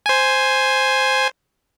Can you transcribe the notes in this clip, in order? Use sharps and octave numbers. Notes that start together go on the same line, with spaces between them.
C5 G#5